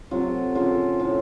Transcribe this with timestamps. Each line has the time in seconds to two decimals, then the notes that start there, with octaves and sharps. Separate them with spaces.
0.11 C3 F#3 A3 F4
0.55 C#3 F3 A3 F4
1.00 A2 A3